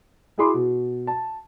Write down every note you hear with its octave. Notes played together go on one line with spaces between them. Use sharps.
E4 F#4 G#4 B5 C6 D6
B2
A5